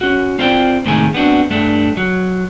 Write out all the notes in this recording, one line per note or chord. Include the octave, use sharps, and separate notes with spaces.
C#4 F#4
C4 F4 C5 D5 G5
A2 C3 D#3 G#3 G#5
B3 C4 D4 F#4
G2 A3 D4
F#3